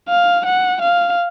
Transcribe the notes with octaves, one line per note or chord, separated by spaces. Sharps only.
F5
F#5
F5